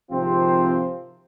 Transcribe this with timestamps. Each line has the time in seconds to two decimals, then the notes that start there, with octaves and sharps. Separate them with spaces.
0.11 G#1 C3 F3 C4 F4 C5